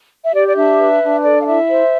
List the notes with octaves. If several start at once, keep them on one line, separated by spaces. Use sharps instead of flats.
E5
G4 D5
D5
D4 E5
B4
D4
A4 D5
F5
E4 E5
C5